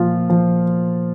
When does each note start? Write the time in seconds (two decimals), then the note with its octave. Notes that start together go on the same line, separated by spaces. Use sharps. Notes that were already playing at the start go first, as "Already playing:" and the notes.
Already playing: A#2 F3 F4
0.30 F3